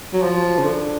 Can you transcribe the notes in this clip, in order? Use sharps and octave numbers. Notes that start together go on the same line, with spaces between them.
F#3
F3
C#3
D3